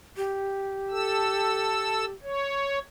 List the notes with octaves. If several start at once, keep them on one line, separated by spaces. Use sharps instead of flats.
G4
A4 E6
C#5